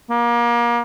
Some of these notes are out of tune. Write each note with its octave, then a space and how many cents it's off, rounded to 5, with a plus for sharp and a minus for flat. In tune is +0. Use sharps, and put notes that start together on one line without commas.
A#3 +30